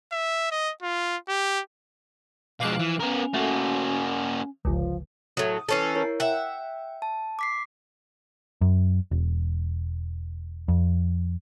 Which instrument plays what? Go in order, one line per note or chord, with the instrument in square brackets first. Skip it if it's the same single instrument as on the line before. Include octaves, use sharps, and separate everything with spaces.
[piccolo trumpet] E5
D#5
F4
G4
[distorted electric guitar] B2 G#3 [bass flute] F3 [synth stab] F5 D6 F#6
[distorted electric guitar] E3
[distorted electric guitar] B3 A#4 [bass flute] C#4
[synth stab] A3 [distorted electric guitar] A#3 F#4
[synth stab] G1 C#2 [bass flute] F3
[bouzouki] A2 F#3 [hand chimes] D#6
[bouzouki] E3 C#4 A4 [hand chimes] A6 C7
[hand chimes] E4 A#4 C#5
[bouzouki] E5 F#5 [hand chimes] G5
[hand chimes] A5
D6 B6 C7
[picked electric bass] F#2
E1
F2